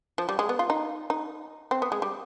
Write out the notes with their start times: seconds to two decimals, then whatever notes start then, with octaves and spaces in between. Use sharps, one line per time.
0.18 F3
0.29 G3
0.39 G#3
0.49 B3
0.59 F4
0.70 D#4
1.10 D#4
1.71 C4
1.82 B3
1.92 G#3
2.02 G3